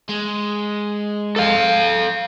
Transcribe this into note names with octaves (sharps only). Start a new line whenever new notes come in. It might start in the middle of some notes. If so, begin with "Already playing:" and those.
G#3
A4 F5